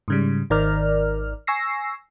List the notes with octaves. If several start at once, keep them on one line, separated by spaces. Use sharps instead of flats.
G#2 C#3 G3
G#1 D#3 A#4 D5 F6
G#5 C#6 E6 A#6 C7